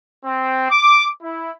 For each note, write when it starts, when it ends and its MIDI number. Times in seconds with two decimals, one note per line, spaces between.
0.24 0.67 60
0.71 1.06 86
1.22 1.51 64